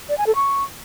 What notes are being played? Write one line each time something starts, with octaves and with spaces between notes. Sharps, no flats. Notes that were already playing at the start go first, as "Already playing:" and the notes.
D5
G#5
A4
C#6